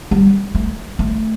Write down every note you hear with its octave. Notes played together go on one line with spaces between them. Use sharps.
G3
A3
A3